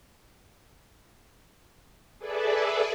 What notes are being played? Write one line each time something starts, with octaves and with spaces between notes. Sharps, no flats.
G#4 A4 B4 D5 E5